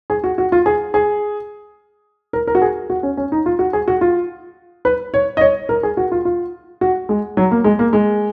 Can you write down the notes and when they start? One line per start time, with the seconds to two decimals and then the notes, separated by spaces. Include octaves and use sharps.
0.10 G#4
0.24 F#4
0.38 F#4
0.52 F4
0.66 G#4
0.94 G#4
2.33 A#4
2.47 A#4
2.55 F#4
2.62 G#4
2.90 F#4
3.03 C#4
3.17 C#4
3.32 D#4
3.46 F4
3.59 F#4
3.73 G#4
3.88 F#4
4.01 F4
4.85 B4
5.14 C#5
5.37 D#5
5.41 C#5
5.69 A#4
5.83 G#4
5.97 F#4
6.12 F4
6.25 F4
6.81 F#4
7.09 G#3
7.37 F#3
7.51 A#3
7.64 G#3
7.79 A#3
7.93 G#3